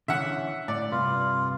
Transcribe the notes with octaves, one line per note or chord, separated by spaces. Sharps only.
D3 E3 C#4 E5 F#5
A2 D5
G2 C3 F4 B4